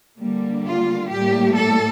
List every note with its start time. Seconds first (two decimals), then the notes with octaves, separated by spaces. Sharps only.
0.19 D3 G3 A#3
0.66 F4
1.10 A2 G3 A#3 G4
1.56 A4